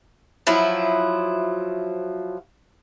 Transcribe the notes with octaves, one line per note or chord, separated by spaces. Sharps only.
F3 F#3 E4